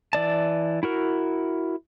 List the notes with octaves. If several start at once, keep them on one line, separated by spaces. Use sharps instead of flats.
E3 D5 A5
E4 F#4 A#4